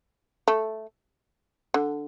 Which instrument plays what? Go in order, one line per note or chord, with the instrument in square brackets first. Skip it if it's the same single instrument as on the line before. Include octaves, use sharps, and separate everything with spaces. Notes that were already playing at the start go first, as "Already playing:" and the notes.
[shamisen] A3
D3